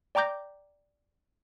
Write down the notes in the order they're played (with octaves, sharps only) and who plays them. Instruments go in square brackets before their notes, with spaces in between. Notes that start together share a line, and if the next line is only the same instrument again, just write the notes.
[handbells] D5 G5 A#5 D6 G6 A#6